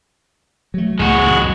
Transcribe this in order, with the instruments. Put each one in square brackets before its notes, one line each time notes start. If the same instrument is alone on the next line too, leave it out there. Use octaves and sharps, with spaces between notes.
[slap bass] F#3 A3
[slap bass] C#2 A2 [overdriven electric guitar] G#3 F#4
[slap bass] C#2 F#2 A#2